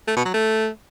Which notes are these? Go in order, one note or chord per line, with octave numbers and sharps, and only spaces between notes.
A3
B2
F#3
A3